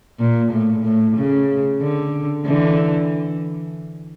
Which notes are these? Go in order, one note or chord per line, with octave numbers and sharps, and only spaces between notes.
A#2
A2
A2
C#3
D3
D3 E3